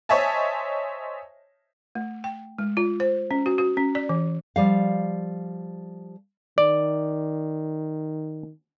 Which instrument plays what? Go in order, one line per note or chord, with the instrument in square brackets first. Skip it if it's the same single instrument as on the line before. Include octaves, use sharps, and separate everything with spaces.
[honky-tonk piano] C5 C#5 D#5 E5 G#5 A5
[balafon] A3
G5
G#3
F4
C5
C#4
F#4
F#4
C#4
D5
E3
[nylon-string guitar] F3 G3 F5
[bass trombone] D#3 [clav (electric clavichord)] D5